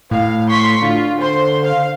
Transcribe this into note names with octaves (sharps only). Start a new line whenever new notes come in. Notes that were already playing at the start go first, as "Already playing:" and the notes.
A2 F5
C6 C#6 B6
D3 F4
C5 C6
F5